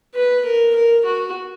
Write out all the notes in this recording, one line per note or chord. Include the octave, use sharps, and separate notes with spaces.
B4
A#4
A#4
F#4